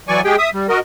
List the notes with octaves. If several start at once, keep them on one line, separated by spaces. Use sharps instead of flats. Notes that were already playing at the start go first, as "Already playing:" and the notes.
E3 F#3 D5 G#5 C#6
G#3 G4 G#4 G5
E5 D#6
G3
F#4 A#4 D#5